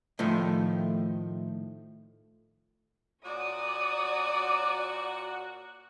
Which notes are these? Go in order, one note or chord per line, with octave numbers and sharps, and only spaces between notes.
A2 D#3 F3 A3
A#2 F#4 C#5 D5 D#6